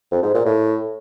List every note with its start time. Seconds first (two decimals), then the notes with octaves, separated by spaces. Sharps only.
0.12 F2
0.23 G#2
0.34 A#2
0.46 A2